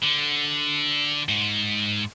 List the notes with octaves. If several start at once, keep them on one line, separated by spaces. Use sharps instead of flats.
D3
G#2